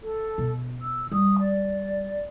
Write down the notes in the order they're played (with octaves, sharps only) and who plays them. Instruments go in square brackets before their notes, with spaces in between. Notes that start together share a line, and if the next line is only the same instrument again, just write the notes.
[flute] A4
[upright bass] B2
[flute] E6
[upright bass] G3 [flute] D#6
[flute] D5